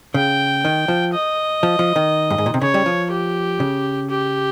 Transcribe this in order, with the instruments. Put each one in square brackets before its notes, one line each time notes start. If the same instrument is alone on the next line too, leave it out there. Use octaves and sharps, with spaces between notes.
[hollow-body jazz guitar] C#3 [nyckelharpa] G5
[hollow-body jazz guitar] D#3
F3
[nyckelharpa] D#5
[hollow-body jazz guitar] F3
F3
D#3
G2
G#2
A#2
C3
[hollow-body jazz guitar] C#3 [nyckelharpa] C#5
[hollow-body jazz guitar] G3
F3
[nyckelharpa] G4
[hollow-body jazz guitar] C#3
[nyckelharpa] G4